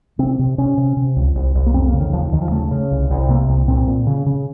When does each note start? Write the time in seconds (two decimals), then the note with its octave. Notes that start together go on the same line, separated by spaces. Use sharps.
0.19 C3 C4
0.39 C3
0.58 C3 C#4
0.77 C3
0.97 C3
1.16 C#2
1.35 C2
1.55 C2
1.66 A#3
1.74 F2 C4
1.88 A#3
1.94 C#3
2.00 D#3
2.13 D#2 F3
2.32 D#2 D#3
2.42 F3
2.51 C#3 A3
2.71 C#3
2.91 C2
3.11 C2
3.29 C3 A#3
3.49 C2
3.68 A#2 C4
3.87 A#2
4.07 C#3
4.26 C#3